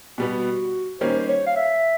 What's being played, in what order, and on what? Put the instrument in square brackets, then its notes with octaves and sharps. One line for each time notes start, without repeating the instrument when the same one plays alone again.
[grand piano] B2 G3 B3 [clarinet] F#4
[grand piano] D#3 G3 A#3 C#4 [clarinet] C5
[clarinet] C5
C#5
F5
E5